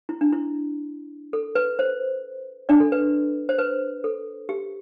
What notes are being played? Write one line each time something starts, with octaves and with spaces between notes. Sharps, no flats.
E4
D4
E4
A4
B4
C5
D4 D5
A4
B4
C5
B4
A4
G4